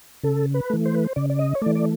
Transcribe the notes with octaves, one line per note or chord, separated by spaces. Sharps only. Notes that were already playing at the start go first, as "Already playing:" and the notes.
C#3 A4
B4
E3 A3
C5
B4
C5
C#3 D5
D5
D#5
C#5
E3 A3 D5
D5